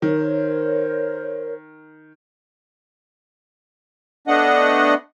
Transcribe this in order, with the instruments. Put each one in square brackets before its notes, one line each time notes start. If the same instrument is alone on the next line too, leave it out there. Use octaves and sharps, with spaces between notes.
[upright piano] D#3 [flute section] A#4 C5 C#5
[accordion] A3 B3 D4 D#5 F#5